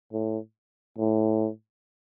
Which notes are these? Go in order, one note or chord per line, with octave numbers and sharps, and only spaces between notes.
A2
A2